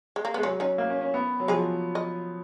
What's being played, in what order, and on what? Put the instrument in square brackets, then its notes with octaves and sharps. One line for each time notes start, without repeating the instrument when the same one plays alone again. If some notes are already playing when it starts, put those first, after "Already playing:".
[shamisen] G#3
A#3
[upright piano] G#3 [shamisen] B3
[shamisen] C#3 C#4 [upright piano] F#3
[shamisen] D#3 D#4 [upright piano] C#4
[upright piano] A#3
C#4
C#4
B3
F#3
[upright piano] F3 [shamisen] G#3 G#4
[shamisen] D#5